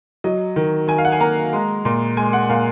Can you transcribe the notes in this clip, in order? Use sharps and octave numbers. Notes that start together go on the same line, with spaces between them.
F#3 D#5
D#3
D#3 G#5
F5
F#5
G#5
A#3 A#5
G#3
A#2
G#3 G#5
F#5
A#2 F5